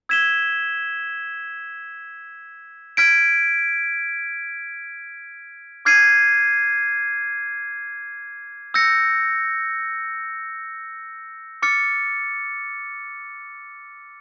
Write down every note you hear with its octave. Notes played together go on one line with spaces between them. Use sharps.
E6 G#6 B6 E7 G7
F6 G#6 B6 D7
D6 F6 G#6 C7 D#7
E6 G6 A#6 C#7
D6 F6 A6 C#7